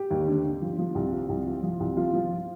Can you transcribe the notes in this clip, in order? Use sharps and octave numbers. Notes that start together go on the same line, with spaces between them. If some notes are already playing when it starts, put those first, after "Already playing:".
Already playing: G4
D#2
D3
D3
F3
F3
C2
F3
C2
F3
F3
C2
F3 F4
F3